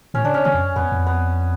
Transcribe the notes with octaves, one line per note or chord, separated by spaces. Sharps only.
A2 C#4
D3 D4
C#3 C#4
C#3 C#4
F2
F#2
F2 B3
F2
B3